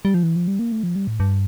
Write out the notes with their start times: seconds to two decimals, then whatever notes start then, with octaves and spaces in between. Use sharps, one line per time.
0.05 G3
0.14 F3
0.23 E3
0.36 F3
0.48 G3
0.59 A#3
0.72 A3
0.83 F3
0.96 G3
1.07 A2
1.20 G2